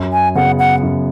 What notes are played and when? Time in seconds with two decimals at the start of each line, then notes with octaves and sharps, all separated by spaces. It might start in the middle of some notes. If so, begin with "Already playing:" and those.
Already playing: F#2
0.12 G#5
0.35 C#3 B3 G#4 F#5
0.59 F#5
0.83 F#2